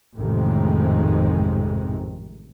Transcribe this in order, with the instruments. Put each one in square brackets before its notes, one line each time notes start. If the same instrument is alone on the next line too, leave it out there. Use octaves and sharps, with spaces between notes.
[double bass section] A1 F2 G#2 C3 D#3 G#3